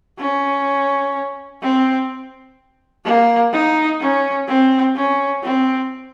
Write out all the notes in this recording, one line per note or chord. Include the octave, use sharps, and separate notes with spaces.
C#4
C4
A#3
D#4
C#4
C4
C#4
C4